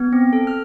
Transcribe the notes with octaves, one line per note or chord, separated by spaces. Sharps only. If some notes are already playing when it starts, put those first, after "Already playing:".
Already playing: B3
C4
A4
F6